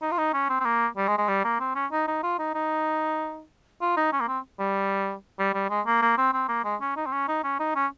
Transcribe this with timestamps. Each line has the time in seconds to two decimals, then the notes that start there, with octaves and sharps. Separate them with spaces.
0.02 D#4
0.12 F4
0.18 D#4
0.34 C#4
0.50 C4
0.60 C4
0.65 A#3
0.97 G3
1.08 G#3
1.18 G#3
1.29 G3
1.45 A#3
1.60 C4
1.75 C#4
1.92 D#4
2.08 D#4
2.23 F4
2.39 D#4
2.55 D#4
3.81 F4
3.97 D#4
4.13 C#4
4.20 A#3
4.28 C4
4.60 G3
5.39 G3
5.54 G3
5.70 G#3
5.87 A#3
6.02 A#3
6.18 C4
6.33 C4
6.49 A#3
6.65 G#3
6.81 C#4
6.97 D#4
7.07 C4
7.12 C#4
7.28 D#4
7.44 C#4
7.60 D#4
7.76 C#4